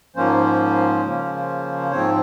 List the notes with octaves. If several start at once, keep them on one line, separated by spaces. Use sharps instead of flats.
G#2 F3 A#3 C#4 C5
C#3 F3 A#3 C#4
G#2 F3 C4 C#5